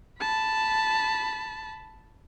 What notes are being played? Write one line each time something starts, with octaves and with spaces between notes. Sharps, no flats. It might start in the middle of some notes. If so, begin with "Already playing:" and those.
A5 B5